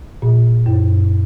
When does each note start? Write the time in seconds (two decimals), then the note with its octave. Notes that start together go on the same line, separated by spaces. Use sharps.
0.22 A#2
0.66 F#2